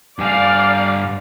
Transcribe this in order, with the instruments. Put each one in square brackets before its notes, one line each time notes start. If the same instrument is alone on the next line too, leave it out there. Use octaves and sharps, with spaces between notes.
[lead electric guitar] G2 G#5 [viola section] D5 F5